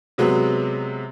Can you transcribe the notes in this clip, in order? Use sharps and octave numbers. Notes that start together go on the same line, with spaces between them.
C3 F#3 G#3 B3